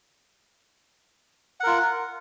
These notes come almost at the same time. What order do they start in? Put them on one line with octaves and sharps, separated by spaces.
F#5 A#4 F4